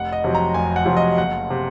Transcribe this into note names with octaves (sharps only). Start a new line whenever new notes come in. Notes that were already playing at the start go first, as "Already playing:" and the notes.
Already playing: F1 F#5
D#5
F2 C3 F#3
A#5
F1 G#5
F#5
F2 C3 F#3
D#5
F#1 F#5
C3